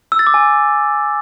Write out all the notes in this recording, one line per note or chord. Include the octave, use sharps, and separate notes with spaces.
E6
A6
D6
G#5